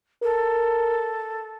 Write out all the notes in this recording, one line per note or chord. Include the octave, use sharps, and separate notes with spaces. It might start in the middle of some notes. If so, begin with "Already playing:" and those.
A4 A#4